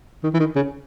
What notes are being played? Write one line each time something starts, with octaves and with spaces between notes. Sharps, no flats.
D#3
E3
D#3
C#3